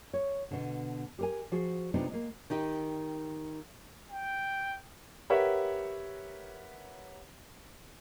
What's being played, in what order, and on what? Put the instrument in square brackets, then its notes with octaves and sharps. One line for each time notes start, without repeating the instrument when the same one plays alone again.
[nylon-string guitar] C#5
B2 D3
G4 A#4 G#5
F3 F#4 G#4
C3 G#3 B3 D4 D#4 F4
G#3 A#3
D#3 D#4 G4
[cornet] G5
[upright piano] G4 A#4 B4 C#5 E5 F#5